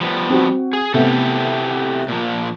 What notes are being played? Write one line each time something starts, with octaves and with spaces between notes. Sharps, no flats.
F3 G3 B3
C4 F#4
G#4
C3 A3 B3 E4 G4 A4
A#2 F3